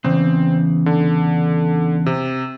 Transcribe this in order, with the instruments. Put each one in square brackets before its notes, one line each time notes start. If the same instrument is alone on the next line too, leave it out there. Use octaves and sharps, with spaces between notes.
[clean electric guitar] E2 C#3 [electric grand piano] C4
[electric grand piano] D3
C3